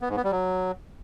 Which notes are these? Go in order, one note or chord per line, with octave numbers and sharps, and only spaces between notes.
B3
G#2
B3
G3
F#3